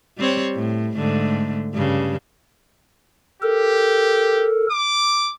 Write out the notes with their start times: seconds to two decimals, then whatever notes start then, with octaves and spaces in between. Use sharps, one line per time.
0.18 G3 C4 C#5
0.55 A2
0.95 G#2 D3 A3
1.74 G2 C#3
3.42 G4 A4 A#4
4.71 D6